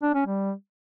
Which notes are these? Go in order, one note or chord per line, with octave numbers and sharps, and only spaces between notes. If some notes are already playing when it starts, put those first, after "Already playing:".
D4
C#4
G3